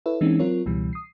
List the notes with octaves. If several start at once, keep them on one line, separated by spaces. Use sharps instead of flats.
E4 A4 B4 C#5 E5
E3 G#3 A#3 C4 C#4 D#4
F#3 C4 F4 A#4 C#5
C#2 B2 E3 G3
D#6 C7